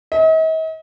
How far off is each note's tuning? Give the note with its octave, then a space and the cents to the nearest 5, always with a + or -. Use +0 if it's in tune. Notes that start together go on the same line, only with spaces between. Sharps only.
D#5 +45